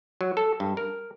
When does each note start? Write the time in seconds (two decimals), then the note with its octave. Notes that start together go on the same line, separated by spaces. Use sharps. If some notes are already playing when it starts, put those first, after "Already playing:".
0.21 F#3
0.37 A4
0.60 G2
0.77 A#4